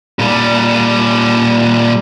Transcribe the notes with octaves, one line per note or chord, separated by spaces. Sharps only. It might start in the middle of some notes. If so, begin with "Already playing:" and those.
A#2 G3